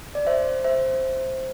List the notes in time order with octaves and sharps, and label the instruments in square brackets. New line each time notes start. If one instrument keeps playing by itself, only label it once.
[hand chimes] D5
C5 E5
C5 E5